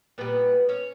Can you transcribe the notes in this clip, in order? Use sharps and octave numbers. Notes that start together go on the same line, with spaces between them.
A#2 G3 B3 B4
C#4 C#5